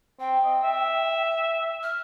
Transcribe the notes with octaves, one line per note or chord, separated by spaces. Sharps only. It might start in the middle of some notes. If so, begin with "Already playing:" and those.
C4 G5
D#5
E5
F6